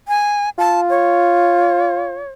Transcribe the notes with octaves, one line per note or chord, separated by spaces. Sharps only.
G#5
F4 A5
C#5